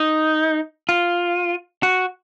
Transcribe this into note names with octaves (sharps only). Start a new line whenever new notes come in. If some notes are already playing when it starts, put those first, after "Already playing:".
Already playing: D#4
F4
F#4